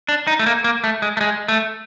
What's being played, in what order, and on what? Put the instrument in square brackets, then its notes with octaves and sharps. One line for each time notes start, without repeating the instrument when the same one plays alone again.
[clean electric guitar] D4
D#4
A3
A#3
A#3
A3
G#3
A3
G#3
A3